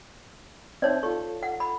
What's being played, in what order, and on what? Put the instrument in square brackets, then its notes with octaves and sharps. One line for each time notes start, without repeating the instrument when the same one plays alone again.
[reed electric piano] C4 E5 A5 [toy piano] D#4 C#5 D5
[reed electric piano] F4 A4 [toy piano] C#6
[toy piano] F#5
B5